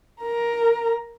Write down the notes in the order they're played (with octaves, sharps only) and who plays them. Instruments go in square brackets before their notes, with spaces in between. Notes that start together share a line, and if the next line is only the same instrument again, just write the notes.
[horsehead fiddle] A#4 A#5